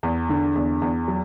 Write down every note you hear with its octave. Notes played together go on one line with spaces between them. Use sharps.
E2
D3
E2
E2
F#3